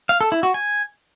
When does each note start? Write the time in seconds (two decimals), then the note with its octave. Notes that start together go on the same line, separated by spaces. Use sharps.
0.09 F5
0.21 A4
0.32 E4
0.43 F#4
0.54 G#5